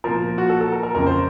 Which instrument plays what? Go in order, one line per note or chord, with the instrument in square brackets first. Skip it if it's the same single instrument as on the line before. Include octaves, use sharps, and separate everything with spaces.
[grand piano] A#2 F3 A#4
F#4
A4
A4
A#4
A#4
F2 C#3 F3 A#4
C5